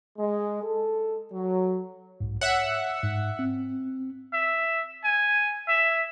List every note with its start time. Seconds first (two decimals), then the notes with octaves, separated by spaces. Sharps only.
0.19 G#3
0.63 A4
1.33 F#3
2.20 B1 G#2
2.41 C#5 E5 F#5
3.03 G#2
3.39 C4
4.33 E5
5.04 G#5
5.69 E5